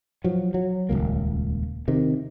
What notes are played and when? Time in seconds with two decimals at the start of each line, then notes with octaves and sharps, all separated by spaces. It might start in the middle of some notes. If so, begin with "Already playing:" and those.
0.24 F3 F#3
0.54 F#3
0.89 D#1 G#1 C#2 A#3
1.88 C3 D#3